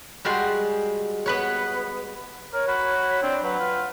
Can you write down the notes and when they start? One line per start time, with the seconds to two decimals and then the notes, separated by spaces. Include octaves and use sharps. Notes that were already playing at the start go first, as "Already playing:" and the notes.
0.25 G3 G#3 F#4 G5 C6
1.26 B3 B4 C#5
2.53 A#4 C#5
2.68 F#4 B5
3.22 C4 D4
3.43 F#3 B4 F#5
3.59 F4